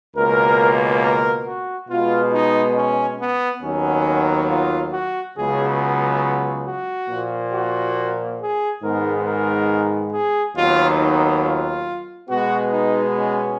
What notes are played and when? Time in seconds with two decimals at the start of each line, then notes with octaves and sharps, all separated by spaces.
0.16 C#2 B2 A#3 A#4
1.03 A#4
1.46 F#4
1.89 B2 G#3 B3 F4
2.33 D#4
2.76 C#4
3.19 B3
3.62 D#2 D#3 F#3 B3 C#4
4.49 F4
4.93 F#4
5.36 C#2 C#3 F#3 B3 G#4
6.66 F#4
7.09 A#2 F3 A#3
7.53 F#4
8.40 G#4
8.83 G#2 D#3 G#3 B3 A#4
9.26 A#4
10.12 G#4
10.56 D#2 D#3 F#3 B3 F4
11.00 D#4
11.42 F4
12.29 B2 G#3 B3 F#4
12.72 D#4
13.16 C#4